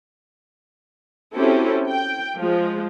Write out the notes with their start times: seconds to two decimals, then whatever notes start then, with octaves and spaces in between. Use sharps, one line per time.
1.35 C4 C#4 E4 F#4 G4 A4
1.91 G5
2.38 F3 G#3